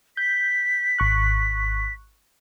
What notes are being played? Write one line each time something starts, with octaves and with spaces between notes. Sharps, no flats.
G6 B6
G#1 C#6 F#6